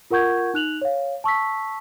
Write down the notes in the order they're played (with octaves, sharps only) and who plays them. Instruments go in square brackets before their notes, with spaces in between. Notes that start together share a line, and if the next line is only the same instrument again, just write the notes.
[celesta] F4 A#4 F#5 C#6 G6 G#6
D#4 F#6 F7 F#7
C#5 F5
A5 C#6 E6 B6